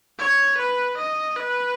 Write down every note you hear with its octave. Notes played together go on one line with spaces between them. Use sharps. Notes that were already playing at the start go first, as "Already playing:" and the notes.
C#5
B4
D#5
B4